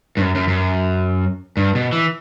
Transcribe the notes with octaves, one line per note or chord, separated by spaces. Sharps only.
G2
F#2
F#2
F#2
G2
B2
E3